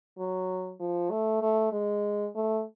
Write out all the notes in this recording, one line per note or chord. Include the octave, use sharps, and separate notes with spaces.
F#3
F3
A3
A3
G#3
A3